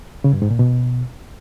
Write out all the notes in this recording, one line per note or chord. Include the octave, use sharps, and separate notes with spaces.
C#3
G2
G#2
A#2
B2